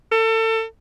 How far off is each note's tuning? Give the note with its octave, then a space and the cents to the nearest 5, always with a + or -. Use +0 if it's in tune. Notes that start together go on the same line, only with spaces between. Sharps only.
A4 +30